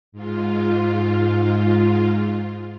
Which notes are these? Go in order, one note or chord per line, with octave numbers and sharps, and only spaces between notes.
G#2 F4